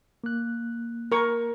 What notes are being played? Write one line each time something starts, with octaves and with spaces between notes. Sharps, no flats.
A#3 F#6
A#4 C#6